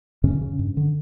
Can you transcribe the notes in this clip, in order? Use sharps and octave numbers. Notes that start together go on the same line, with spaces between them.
F#2 C#3 C#4
C#3
G2
D3